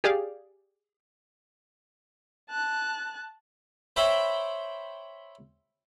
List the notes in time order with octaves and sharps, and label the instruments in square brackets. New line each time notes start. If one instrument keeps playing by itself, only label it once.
[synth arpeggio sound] G4 G#4 D5 F5
[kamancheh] A5 F#6
[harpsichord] C5 C#5 E5 G5 B5